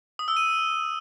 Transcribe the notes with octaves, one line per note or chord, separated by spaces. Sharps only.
D#6
E6
D#7